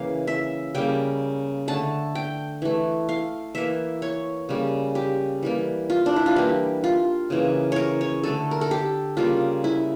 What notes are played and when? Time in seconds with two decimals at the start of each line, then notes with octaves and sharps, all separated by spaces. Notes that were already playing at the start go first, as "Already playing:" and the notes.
Already playing: C#3 E3 A#3 F5
0.27 E5
0.75 C#3 G3 A#3 G5
1.68 D3 A3 A5
2.15 G5
2.62 E3 A3
3.09 F5
3.55 E3 A#3 E5
4.02 C#5
4.49 C#3 G3 A#3
4.95 G4
5.43 E3 G3 A#3
5.90 F4
6.06 D4
6.16 E4
6.26 F4
6.36 E3 G3 A#3 G4
6.84 F4
7.30 C#3 E3 A#3
7.72 A#4 C#5
8.01 C#5
8.23 D3 A3 A4
8.51 A#4
8.61 A4
8.71 G4
9.17 C#3 G3 A#3 F4
9.64 E4